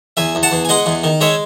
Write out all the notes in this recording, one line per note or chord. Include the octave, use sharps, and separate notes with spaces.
E2 E5 G#5
E2
F#5 A5
E2
G#5
G#3 D#5 F#5
E2
D#3
G#3 C#5 E5